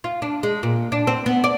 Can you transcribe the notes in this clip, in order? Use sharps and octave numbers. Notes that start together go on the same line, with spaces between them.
F4
D4
G#3
A#2
D4
C4
B3
D5